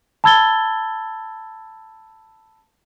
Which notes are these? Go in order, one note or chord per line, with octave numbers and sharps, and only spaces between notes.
A5 B5 E6 G#6 A6 G7